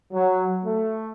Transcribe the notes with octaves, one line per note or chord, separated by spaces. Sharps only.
F#3
A3